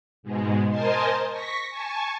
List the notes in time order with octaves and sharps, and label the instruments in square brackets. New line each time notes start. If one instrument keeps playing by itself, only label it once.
[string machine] G#2 B2 G#3
A#4 C5 D#5 G#5 A5 C6
C#6 A#6 B6
G#5 A5 C#6